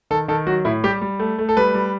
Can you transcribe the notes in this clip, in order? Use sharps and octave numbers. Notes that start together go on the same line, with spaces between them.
D#3 A4
D#3 A4
F#3 F#4
A2 E4
G3 G4
G3
A3
A3
A4
G3 B4
G3